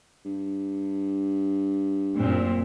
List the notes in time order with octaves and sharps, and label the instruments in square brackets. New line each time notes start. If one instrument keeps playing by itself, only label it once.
[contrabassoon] G2
[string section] F#2 A#2 C4